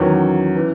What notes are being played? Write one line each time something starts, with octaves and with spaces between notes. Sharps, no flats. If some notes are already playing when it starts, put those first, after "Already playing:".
Already playing: E2 D#3 F#3 C#4
E3